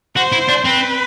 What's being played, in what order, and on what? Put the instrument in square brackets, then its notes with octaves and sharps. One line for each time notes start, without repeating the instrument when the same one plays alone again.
[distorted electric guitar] F#4 [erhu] C5
[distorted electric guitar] E4
D4
[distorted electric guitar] C4 [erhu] B4